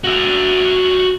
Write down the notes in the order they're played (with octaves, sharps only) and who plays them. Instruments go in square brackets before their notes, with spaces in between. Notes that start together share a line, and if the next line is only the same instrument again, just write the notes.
[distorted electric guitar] F#4 E5